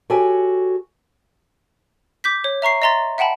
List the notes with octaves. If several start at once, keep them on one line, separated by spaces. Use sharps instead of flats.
F#4 G4 A4 C#5 G5 G#5
D6 G6 B6
C#5
E5 A#5 C#6 C7
D#5 E5 A#5 C6 A6
E5 F#5 G5 A5 B5